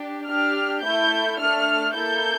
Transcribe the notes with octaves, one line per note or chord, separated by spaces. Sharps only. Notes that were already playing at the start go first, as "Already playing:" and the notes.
Already playing: D4 G4
D4 G4 F6
A3 E4 A4 G6
A3 D4 A4 F6
A#3 E4 A4 G6